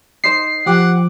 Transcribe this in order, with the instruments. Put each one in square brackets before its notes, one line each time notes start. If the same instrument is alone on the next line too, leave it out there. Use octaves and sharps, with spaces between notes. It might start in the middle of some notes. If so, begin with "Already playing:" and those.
[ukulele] D#4 C5 [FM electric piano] C7
[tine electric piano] F3 D6 [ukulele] G4 [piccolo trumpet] F#5